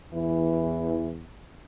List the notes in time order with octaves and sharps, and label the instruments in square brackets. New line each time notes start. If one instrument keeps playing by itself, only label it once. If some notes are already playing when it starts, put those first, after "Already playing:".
[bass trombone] E2 [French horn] E3